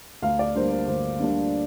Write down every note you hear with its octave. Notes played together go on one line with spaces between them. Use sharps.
D2 F5
D5
D3 G3 A#3 D4 C5
C5
D2 C5
D3 G3 A#3 D4